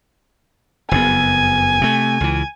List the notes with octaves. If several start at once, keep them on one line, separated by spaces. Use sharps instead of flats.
F#1 F2 B3 G#5
C3 A3
C#2 E3